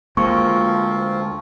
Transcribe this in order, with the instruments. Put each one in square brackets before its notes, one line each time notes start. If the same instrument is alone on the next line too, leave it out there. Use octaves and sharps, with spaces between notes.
[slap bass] D2 G#3 A#3 [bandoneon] F3 C4 F4 [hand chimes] C#6